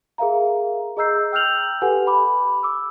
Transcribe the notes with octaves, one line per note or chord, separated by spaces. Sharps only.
G#4 A#4 E5 F5 A#5
G#4 D#5 A#5 E6 G6 C7
G5 E6 F6 G6 F7 F#7
G4 A4 B4 F#5 G#5
B5 D6
D6 E6